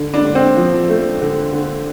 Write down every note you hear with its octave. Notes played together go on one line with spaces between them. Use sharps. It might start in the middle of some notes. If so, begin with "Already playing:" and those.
Already playing: D3
D4
D3
C4
F3
A3
D3
D3